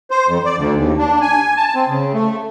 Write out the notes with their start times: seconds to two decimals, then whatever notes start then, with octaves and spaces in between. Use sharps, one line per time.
0.11 C5
0.28 F2
0.45 D5
0.57 D2
0.76 D#2
0.98 D4
1.21 G#5
1.57 A5
1.75 C4
1.88 C#3
2.14 A3